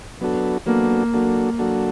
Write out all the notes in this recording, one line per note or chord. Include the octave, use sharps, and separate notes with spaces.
F#3 B3 D4 F#4 A4
F#3 A#3 B3 D4 F#4 A4
F#3 A#3 D4 F#4 A4
F#3 A#3 D4 F#4 A4